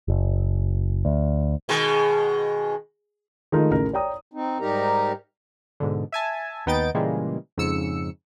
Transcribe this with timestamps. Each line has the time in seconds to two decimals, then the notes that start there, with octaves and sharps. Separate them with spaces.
0.08 F#1
1.05 D2
1.69 B2 D#3 G#3
3.52 D#3 G#3 A3 D#4 F4 A#4
3.71 A1 C#3 A#4
3.93 C#5 D5 G5 A#5 D#6
4.34 C4 D#4
4.60 G#2 G3 D#4 G4 A#4 A#5
5.80 G#2 B2 D3
6.12 E5 G#5 A5
6.66 D#2 B3 D#4 G5 A6 D7
6.94 A#2 C#3 E3 G3 G#3 A#3
7.57 F2 G#2 C#3 E6 C#7